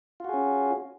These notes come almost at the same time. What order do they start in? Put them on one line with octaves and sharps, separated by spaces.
F4 F#4 G#4 C#4